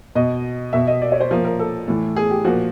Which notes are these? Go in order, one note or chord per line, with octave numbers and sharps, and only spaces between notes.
B2 D#5
B2 E5
D#5
D5
C#5
C5
A#2 F3 A#4
A#4
A4
A2 E3
G#4
G4
A#2 F3 F#4